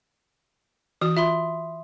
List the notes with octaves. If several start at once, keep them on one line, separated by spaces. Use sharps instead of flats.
E3 F#4 D#6
F4 E5 B5 C6